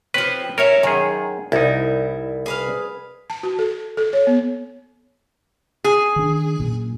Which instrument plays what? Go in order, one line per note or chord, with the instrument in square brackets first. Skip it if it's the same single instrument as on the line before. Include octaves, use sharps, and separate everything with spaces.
[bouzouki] F3 C4 [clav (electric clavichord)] B4 C#5
[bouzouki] C#4 E4 A4 [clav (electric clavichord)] A#4 C#5
[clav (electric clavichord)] F#2 G#4 [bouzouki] D#3
[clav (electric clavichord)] C2 D#4 [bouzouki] E4
[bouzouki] G#4 B4 F5
[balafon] A5
F#4
A4
A4
C#5
B3
[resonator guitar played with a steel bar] G#4
[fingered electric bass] D#3 D4
F#2 A#2